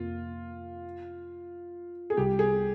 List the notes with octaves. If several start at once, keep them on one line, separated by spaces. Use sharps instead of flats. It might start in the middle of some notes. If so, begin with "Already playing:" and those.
Already playing: F2 C3 A#3 F4
G#4
C2 C3 G3 G4
G#4